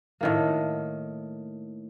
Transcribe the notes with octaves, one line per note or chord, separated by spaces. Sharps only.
A2 D#3 A#3